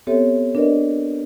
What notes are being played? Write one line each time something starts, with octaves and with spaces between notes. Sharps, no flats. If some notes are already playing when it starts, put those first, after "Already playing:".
B3 C4 G4 A4 C#5 E5
D4 A#4 B4 D5 D#5